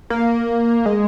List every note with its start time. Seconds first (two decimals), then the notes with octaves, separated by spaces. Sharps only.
0.10 A#3
0.86 G#3